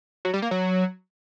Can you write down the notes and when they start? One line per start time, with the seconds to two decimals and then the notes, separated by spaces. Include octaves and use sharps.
0.25 F#3
0.34 G3
0.42 A#3
0.51 F#3